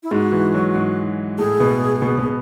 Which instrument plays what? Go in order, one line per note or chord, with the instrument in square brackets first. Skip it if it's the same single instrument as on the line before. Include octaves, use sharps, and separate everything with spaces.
[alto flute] E4
[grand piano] G#2 G#3 [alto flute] F#4
[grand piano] E3
F#3
G#2 G#3
[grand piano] A2 A3 [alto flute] G#4
[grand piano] B2 B3
B2 B3
B2 B3